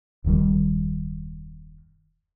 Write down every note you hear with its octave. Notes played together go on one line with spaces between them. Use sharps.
D#1 F#2 D#3 G3